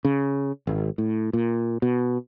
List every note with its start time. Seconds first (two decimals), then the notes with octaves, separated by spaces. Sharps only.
0.05 C#3
0.67 G#1
0.98 A2
1.33 A#2
1.82 B2